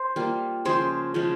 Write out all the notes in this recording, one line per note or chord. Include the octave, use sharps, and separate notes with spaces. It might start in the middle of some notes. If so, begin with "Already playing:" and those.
Already playing: C5
G3 A#3 F4
C#3 F3 G#3 G#4 C5
C#3 F3 G#3